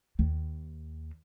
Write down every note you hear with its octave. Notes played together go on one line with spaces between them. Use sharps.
D#2